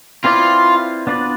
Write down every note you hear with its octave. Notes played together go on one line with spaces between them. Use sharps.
C4 E4 F4 B4 D5
B3 D4 F4 B4 D5